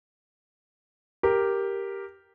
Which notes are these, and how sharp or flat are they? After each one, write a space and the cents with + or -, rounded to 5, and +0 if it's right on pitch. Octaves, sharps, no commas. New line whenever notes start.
G4 +0 A#4 +0